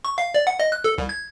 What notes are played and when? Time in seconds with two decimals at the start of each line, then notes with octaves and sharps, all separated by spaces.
0.05 C#6
0.18 F5
0.34 D5
0.47 F#5
0.60 D#5
0.72 F#6
0.84 A4
0.98 C2
1.09 G#6